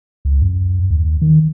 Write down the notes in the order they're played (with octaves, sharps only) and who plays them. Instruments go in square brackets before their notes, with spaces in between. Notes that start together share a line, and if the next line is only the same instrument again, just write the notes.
[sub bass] C#2
F#2
D#2
D#3